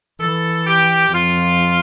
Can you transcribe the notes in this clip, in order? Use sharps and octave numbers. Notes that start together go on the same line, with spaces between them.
E3 A4
G4
F2 F4